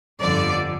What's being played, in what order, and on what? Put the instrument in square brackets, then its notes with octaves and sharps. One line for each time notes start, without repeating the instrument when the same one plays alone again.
[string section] G1 F2 D3 F3 D5